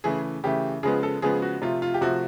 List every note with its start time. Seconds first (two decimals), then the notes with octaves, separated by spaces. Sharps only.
0.04 C#3 E3 A3 G#4
0.44 C#3 E3 A3 G4
0.83 C#3 F3 G#3 B3 G#4
1.03 A4
1.22 C#3 F3 G#3 B3 G#4
1.42 F#4
1.62 C3 F3 A3 F4
1.82 F4
1.94 G4
2.01 C3 F3 A3 F#4